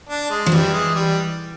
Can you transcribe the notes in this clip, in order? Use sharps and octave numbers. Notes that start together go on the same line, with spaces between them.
D4
G#3
F3
E3 G3
G#3
G3